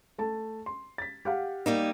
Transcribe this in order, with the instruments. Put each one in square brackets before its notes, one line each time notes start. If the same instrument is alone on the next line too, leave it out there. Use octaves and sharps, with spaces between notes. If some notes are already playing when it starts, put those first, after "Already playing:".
[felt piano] A3 A5
C6
A6 B6
G4 F5 F#5
[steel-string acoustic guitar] G3 A#3 D#4